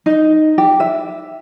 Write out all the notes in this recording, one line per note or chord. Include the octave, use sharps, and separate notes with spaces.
D#4
G4
E5